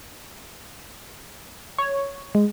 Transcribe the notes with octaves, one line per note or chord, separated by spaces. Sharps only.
C#5
G#3